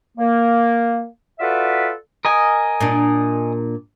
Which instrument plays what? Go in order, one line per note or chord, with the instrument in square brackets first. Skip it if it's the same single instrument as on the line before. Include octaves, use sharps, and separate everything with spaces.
[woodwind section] A#3
F4 F#4 A4 B4 D5 E5
[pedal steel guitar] A#4 D#5 G#5
[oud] A#2 D4